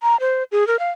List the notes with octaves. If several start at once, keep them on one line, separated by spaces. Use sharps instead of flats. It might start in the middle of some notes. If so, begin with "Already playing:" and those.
A#5
C5
G#4
A#4
F5